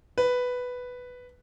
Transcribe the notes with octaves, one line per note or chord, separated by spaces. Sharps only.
B4